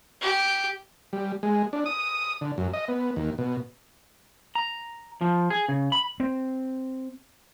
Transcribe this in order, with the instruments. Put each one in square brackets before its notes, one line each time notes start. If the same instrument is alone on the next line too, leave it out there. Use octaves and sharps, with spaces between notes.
[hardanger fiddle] G4
[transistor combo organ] G3
G#3
D4
D#6
D3
F#2
D#5
B3
D#2
B2
[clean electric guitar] A#5
F3
G#4
C#3
B5
[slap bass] C4